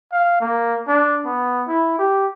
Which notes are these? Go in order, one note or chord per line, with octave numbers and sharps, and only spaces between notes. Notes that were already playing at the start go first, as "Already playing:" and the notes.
F5
A#3
D4
B3
E4
G4